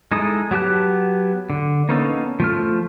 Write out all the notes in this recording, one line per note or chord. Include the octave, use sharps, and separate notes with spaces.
G#3 D#4 E4 A4 D#6
F#3 B3 G4 A5 F#6
D3
A#3 B3 C#4 D#4 A4
F3 A3 F6